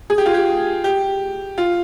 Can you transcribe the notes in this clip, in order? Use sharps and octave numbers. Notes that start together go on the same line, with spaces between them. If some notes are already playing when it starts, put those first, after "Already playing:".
G#4
G4
F4
G4
G4
F4